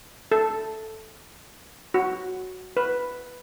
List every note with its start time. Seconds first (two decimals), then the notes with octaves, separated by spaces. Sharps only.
0.32 A4
1.94 F#4
2.77 B4